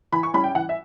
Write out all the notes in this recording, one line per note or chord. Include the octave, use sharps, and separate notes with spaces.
E3 B5
C#6
G3 C#4 E4 B5
G5
E3 F#5
E5